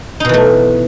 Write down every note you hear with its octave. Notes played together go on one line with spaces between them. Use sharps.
B2 E3 A3 D#4